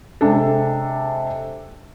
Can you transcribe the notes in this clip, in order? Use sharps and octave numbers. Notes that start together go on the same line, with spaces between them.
C3 G#3 D4 A4